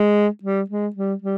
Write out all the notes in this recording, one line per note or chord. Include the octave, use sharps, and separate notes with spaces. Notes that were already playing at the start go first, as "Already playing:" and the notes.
Already playing: G#3
G3
G#3
G3
G3